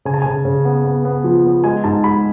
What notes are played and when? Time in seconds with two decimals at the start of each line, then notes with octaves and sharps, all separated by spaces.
0.05 C#3 G#5
0.14 A5
0.22 C#3 G#5
0.45 C#3
0.65 B3
0.85 B3
1.05 B3
1.24 F3
1.45 B3
1.64 G#3 G#5
1.84 G#2 A5
2.04 G#3 B5